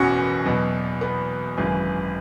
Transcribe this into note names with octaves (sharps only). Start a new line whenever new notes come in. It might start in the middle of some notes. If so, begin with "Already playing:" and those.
Already playing: F#1 E2 B2 C#4 F#4 G#4
E2 B2 F#3
B3
G#1 F#2 C#3 E3